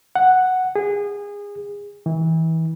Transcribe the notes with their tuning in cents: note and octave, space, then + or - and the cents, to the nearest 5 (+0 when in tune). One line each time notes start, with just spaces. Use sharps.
F#5 +0
G#4 -25
E3 -30